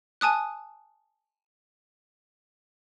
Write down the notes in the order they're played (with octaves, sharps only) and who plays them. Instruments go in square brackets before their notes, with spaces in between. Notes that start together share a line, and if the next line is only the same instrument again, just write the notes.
[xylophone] G#5 A5 D#6 F#6